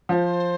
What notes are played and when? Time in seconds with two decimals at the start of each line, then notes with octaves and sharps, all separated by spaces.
0.09 F3 C5 C#5